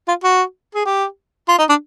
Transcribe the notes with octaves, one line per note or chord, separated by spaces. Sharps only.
F4
F#4
G#4
G4
F4
D#4
D4